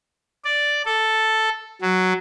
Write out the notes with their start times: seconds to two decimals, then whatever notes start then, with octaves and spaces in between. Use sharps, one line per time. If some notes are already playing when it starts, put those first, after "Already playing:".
0.45 D5
0.85 A4
1.82 F#3